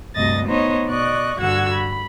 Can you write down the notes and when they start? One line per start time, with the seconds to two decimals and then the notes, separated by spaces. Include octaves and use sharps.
0.15 D2 G2 C3 D#5 A6 A#6
0.46 B3 D#4 C5 C#5 D#5
0.86 B2 D5 D#5 C#6 F#6
1.38 G2 D3 F#4 F#5 E6 G#6
1.71 B5